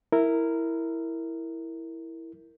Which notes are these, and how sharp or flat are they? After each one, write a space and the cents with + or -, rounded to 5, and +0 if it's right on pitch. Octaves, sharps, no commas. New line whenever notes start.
E4 +0 A#4 -10